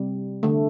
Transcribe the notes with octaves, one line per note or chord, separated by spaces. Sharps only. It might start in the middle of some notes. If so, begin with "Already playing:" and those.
Already playing: C3 G3
D3 A3